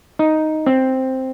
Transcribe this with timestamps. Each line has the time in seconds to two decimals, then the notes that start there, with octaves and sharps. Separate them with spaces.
0.19 D#4
0.66 C4